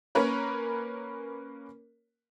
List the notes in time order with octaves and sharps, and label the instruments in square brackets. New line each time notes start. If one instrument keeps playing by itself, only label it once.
[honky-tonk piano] A#3 C#4 A#4 B4 C#5